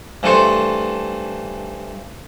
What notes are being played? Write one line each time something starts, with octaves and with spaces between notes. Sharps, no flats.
G2 E3 A3 A4 C5 C#6